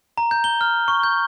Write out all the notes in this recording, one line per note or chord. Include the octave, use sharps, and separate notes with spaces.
A#5
G6
G7
F6
C#6
G6